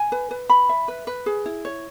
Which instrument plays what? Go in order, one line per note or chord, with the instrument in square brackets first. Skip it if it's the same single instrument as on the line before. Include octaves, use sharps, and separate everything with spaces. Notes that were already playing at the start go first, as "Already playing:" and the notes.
Already playing: [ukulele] G#5
B4
B4
B5
E5
B4
B4
G#4
E4
C#5